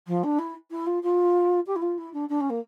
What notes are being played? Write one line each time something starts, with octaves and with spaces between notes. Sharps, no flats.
F3
D4
E4
E4
F4
F4
G4
E4
F4
E4
D4
D4
C#4
A#3